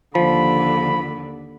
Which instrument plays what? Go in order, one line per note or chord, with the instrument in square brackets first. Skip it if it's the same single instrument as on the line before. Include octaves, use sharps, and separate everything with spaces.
[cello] D#2 D3 [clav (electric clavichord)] F3 [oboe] B5